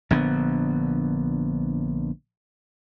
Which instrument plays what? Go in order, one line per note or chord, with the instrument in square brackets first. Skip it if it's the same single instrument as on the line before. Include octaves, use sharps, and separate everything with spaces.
[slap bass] A#1 D3 B3